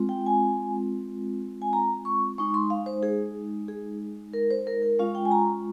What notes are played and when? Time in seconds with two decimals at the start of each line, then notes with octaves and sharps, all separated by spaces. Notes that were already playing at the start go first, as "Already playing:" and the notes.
Already playing: G#3 C4 F4
0.09 G5
0.26 G#5
1.62 G#5
1.73 A#5
2.05 C#6
2.38 G#3 D#4 C#6
2.54 C6
2.70 F5
2.86 C5
3.03 G#4
3.68 G#4
4.34 A#4
4.51 C5
4.67 A#4
4.82 A#4
4.99 G#3 C#4 F4 F5
5.15 G5
5.25 G#5
5.31 A#5